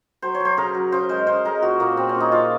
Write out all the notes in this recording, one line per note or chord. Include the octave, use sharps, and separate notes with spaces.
F#3 C5
C#5
F#3 C5
C#3 A#4
F#3
C#3 C5
G#3 C5
C#3 C5
G#3 A#4
A#2 F#4
A#2 A#3
A#2 C4
C#4
A#2
D#4
C#3 F4